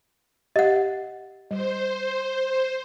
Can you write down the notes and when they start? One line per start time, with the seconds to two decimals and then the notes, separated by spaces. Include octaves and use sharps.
0.56 G4 D#5 F#5
1.51 G3 C5